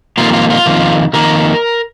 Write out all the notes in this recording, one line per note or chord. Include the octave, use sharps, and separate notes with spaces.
F2 D#3 A#3 F4
F4
F4
F2 D#3 A#3
F2 D#3 A#3 A#4